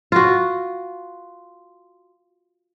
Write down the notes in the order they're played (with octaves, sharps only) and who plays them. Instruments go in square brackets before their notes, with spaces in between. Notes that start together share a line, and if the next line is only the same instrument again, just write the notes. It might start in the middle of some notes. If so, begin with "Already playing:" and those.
[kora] F4 F#4